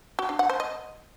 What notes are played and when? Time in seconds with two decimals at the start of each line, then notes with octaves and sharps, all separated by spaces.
0.19 F#4
0.29 D4
0.39 F#5
0.50 C5
0.60 D#5